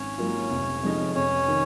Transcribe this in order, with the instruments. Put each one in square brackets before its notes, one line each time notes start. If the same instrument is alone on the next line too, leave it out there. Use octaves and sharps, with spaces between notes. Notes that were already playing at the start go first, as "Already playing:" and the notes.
Already playing: [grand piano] G#1 [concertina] C#4 C#5
[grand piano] G#2 F#3 A#3 F4
F1
F2 F3 G#3 D#4
[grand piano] F1 [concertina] C#4 C#5
[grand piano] D#3